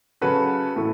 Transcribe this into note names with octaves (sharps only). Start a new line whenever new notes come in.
C#3 F#3 C#4 F#4 A4 B4
A2 E3 A3 E4 A4